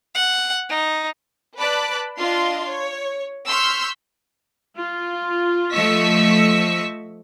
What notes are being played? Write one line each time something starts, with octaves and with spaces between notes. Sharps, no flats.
F#5
D#4
B4 D5 A5 B5 D6 F#6
D4 F4 D#5 F5 C6
C#5
C6 C#6 E6 F6 G6 B6
F4
F3 A3 D#5 C#6 E6 B6